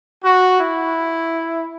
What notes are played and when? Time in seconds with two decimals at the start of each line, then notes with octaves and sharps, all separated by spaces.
0.24 F#4
0.58 E4